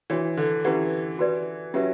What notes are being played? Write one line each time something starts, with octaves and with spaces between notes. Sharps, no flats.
E3 D4 F#4 C#5
D3
E3 C#4 E4 G4 B4 F#5
F#4 B4 D5
F#3 C#4 G4 B4 E5